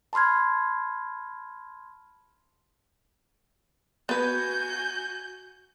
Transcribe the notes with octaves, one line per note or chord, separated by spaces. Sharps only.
A5 B5 C6 F6 G#6
B3 F#4 B4 G#5 G6